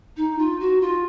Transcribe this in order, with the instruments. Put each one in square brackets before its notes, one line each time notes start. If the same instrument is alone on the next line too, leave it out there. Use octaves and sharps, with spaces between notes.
[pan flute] D#4
F4
F#4
F4